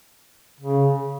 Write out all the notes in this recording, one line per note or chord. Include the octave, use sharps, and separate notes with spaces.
C#3